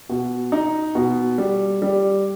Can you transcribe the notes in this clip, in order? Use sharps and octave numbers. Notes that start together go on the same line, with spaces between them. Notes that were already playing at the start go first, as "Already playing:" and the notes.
B2
D#4
B2
G3
G3